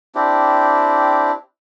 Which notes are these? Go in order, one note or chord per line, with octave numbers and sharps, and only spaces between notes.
C4 D4 E4 G4